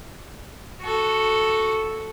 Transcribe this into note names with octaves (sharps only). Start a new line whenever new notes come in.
F#4 A4